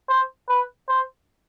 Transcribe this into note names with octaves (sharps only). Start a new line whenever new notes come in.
C5
B4
C5